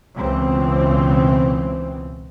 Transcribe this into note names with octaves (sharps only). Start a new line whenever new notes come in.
C#2 B2 E3 C4